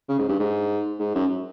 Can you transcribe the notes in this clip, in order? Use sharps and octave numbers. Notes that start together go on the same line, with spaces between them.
C#3
G#2
G2
G#2
G#2
F#2